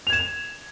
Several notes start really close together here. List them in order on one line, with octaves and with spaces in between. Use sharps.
F7 G#6 E7